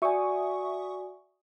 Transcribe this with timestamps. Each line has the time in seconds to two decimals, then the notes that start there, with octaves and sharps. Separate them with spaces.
0.02 F#4 D5 E5 G#5 C#6 D#6